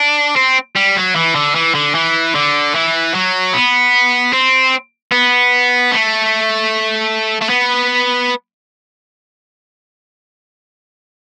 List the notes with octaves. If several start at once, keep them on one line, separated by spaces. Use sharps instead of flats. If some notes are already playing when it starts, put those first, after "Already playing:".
Already playing: D4
C4
G3
F#3
E3
D3
E3
D3
E3
D3
E3
F#3
B3
C4
B3
A3
A3
B3